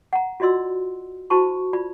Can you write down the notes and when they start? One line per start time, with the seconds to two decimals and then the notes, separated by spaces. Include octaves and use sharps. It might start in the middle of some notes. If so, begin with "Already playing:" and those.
0.13 F#5 A#5
0.40 F4 F#4 D5 D#5 C6 E6
1.30 E4 F#4 C5 A5 B5 C#6
1.73 F4 D5 B5